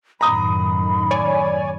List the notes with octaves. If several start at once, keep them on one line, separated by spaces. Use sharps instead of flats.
F#2 A2 D#3 A#5 B5 D#6
C#5 D5 G#5